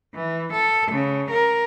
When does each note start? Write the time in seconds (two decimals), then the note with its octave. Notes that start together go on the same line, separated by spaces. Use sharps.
0.14 E3
0.53 A4
0.91 C#3
1.30 A#4